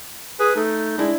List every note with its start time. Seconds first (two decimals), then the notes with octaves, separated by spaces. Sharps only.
0.40 G#4 B4
0.56 A3 D#4
0.98 G#3 D4 E4